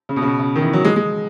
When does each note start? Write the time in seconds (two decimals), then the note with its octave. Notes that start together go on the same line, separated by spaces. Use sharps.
0.09 C#3
0.16 B2
0.22 C#3
0.27 B2
0.39 C#3
0.56 D#3
0.62 E3
0.73 F#3
0.84 G#3
0.96 G#3